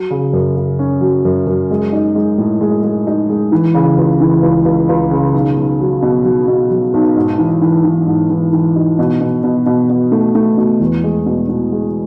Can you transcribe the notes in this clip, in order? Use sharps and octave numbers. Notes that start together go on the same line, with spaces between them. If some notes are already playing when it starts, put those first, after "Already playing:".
Already playing: F#3
C#3
F#2
C#3
C#4
F#3
F#2
F#2
G#3
D#4
G#3
A2
G#3
G#3
D#4
G#3
E3
C#3
C#2
E3
C#2
C#2
C#2
C#3
B1
B1
F#3
B2
F#3
B2
F#3
B1
G#2
E3
E3
E3
G#2
E3
E3
D#4
B2
B2
B2
B2
B2
A3
A3
B2
E2
G#3
B2
B2
G#3